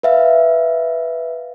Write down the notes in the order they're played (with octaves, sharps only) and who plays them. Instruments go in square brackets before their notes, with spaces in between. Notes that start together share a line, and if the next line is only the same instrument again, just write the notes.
[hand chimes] B4 E5 F5